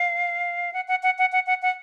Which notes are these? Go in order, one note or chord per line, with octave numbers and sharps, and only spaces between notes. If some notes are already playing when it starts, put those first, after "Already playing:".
Already playing: F5
F#5
F#5
F#5
F#5
F#5
F#5
F#5